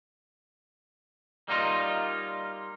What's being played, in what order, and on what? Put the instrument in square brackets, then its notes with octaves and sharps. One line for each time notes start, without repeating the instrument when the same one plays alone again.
[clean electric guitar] G3 A#3 D#4 F4